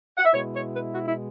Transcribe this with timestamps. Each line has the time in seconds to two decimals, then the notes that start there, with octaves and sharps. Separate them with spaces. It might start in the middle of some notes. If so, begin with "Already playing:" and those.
0.17 F#5
0.25 E5
0.33 B2 G#3 E4 C#5
0.54 C#5
0.73 B4
0.94 F#4
1.08 E4